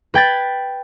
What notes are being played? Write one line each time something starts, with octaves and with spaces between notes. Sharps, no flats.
B4 G5 G#6 A6